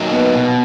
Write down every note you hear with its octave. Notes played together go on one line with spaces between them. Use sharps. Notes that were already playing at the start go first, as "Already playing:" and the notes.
Already playing: F#3 A#3 D#4
B3
B2